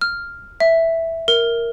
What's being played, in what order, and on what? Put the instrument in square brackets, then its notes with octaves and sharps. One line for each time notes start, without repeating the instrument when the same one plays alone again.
[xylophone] F6
E5
A#4